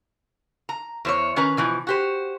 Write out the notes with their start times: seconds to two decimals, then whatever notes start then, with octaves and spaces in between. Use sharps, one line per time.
0.69 A#5
1.05 E2 C5 C#5
1.36 D#3 C#4 B4 A#5
1.57 B2 E3 F3
1.87 F#4 G4 C5